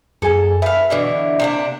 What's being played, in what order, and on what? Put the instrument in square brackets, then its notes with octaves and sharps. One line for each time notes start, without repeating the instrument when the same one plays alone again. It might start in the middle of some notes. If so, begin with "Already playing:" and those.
[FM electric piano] F#2 G#4 G#5 [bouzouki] A4
[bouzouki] B4 F5 [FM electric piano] E5
[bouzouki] B2 D3 E3
C3 A#3 D4